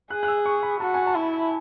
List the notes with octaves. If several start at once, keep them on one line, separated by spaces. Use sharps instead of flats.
G#4 F#6
F#6
E6
C#6
B5
F#4 A5
G#5
A5
E4